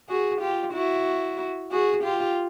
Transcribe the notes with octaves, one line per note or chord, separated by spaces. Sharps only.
F#4 G#4
F4 G4
E4 F#4
F#4 G#4
F4 G4